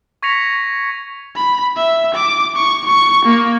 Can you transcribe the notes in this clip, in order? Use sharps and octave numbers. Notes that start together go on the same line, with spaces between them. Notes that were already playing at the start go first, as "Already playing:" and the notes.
C#6 G#6 A#6 B6 C#7 F7
B5
E5
D6
C#6
C#6
A#3